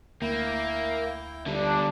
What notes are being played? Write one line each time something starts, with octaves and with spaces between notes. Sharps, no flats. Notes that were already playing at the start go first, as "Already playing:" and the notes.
D2 A#3 E4 G5
D3 G3 D4